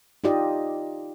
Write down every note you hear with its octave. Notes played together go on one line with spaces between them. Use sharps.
D#4 F4 G4 D5 D#5